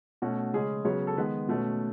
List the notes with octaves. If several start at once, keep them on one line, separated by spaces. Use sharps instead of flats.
B2 A3 C#4 F#4
C#3 G#3 C#4 G#4
C#3 F#3 B3 C#5
A4
D#3 G#3 B3 B4
B2 A3 C#4